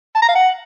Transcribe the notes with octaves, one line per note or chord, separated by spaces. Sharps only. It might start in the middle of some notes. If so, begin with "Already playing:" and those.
A5
A#5
F5
F#5